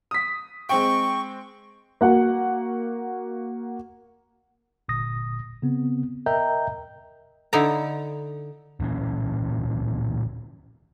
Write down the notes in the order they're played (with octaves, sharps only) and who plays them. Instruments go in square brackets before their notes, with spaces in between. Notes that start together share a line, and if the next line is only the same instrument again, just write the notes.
[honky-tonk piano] D#6 B6
[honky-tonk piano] G#3 C4 G5 [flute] C#6
[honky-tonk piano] A#3 F#4 F#5
[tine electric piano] G1 A#2 D#6 A#6
C#3 B3 C4
A#4 D#5 E5 G5 A#5 G6
[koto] D3 D#4 E4 A4 A#5
[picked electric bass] D1 A#2 E3 C#4